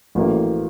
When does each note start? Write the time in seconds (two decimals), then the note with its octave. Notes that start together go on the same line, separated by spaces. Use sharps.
0.15 A1 A2 F#3 A#3